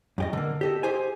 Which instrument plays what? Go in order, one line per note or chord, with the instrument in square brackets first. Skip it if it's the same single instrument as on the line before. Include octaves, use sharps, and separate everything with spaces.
[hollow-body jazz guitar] F#2 G4 D#5
D3 A#3
G4 A4 D#5
G4 G#4 C5 G#5